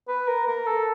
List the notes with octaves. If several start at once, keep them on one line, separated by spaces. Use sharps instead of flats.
B4
A#4
A#4
A4